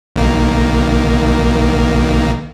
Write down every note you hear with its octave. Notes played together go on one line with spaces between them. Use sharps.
B1 D#3 A#3